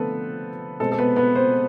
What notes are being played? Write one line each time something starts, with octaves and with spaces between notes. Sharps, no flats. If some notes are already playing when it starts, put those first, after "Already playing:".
Already playing: D3 F3 A3 B3 C4 A4 B4
B2 G#3 C4 A4
A4
B3 B4
B3 B4
C4 C5